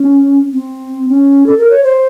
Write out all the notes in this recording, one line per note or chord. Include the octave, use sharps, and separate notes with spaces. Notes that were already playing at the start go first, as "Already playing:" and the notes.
Already playing: C#4
C4
C#4
A4
A#4
C#5
C5